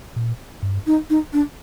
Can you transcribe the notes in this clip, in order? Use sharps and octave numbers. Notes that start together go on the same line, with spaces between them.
A#2
G2
D#4
D#4
D4